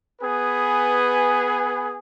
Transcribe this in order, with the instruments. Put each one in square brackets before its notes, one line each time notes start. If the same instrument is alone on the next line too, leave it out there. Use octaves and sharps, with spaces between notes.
[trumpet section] B3 G#4 B4 G#5